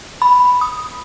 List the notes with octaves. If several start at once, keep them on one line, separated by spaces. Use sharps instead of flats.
B5
D#6